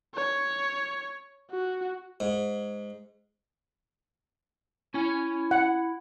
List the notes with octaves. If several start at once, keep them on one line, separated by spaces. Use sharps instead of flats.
C#5
F#4
G#2
C#4 E4 G#5
F#5